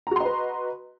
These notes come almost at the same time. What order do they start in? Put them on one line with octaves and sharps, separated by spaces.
A#5 F#4 C6 D#5 B4